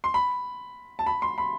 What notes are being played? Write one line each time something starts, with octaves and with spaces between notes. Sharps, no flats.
C6
B5
A5
B5
C6
B5